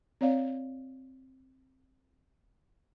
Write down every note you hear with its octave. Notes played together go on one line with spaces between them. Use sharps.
C4 C#5 D5 F5